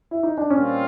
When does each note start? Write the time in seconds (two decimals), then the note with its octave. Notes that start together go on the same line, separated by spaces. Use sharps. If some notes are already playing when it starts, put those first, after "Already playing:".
0.11 E4
0.23 D#4
0.38 D4
0.50 A#2 G3 C4 C#4 F4